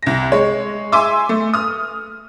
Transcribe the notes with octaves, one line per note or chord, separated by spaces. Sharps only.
C2 A#6
G#3 C#5
E5 G#5 C6 D6 E6
A3
D#6 F6